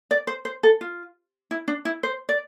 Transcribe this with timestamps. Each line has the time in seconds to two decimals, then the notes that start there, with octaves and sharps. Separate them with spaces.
0.11 D5
0.27 C5
0.45 C5
0.63 A4
0.81 F4
1.51 E4
1.68 D4
1.85 E4
2.03 C5
2.29 D5